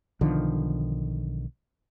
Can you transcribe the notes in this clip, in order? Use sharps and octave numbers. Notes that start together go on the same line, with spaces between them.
B1 D3 D#3 F3